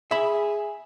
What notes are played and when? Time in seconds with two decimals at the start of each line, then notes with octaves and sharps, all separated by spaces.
0.11 G#4 E5 B5